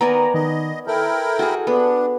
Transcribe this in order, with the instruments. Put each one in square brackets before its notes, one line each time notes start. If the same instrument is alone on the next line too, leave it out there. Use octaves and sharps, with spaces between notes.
[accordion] D#3 [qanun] B3 D5 G#5 [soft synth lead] A#5
[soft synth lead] D#3 [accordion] D#5
[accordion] E4 A#4 G5 [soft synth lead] A4
[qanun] F#4 G#4
[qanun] B3 [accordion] D4